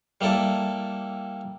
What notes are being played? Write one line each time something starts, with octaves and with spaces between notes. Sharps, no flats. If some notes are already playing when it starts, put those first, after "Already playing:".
G3 A#3 E4 A4 D5